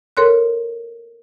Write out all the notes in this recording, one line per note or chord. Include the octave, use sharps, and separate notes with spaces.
A4 A#4 C#5 C6 F#6